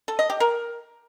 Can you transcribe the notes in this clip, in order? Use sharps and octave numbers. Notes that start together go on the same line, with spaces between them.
A4
D#5
G4
A#4